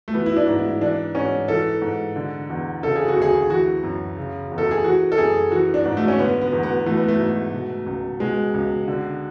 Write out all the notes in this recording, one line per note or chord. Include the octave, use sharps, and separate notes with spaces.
A3
E3 B3
E4
D4
G#2
E4
E3 D4
G#2 C#4
E3 A4
G#2
D3
E2
C#3 A4
G#4
F#4
D2
G#4
E3 F#4
F#2
C#3
E2
A4
G#4
E3 F#4
A4
F#2 G#4
E3 F#4
D4
G#2
A3
C#4
D3 B3
B3
E2
B3
E3 A3
B3
A3
G#2
B2
C#2
B2 G#3
C#2
D3